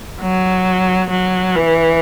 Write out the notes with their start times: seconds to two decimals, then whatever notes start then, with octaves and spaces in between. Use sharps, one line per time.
0.21 F#3
1.10 F#3
1.55 E3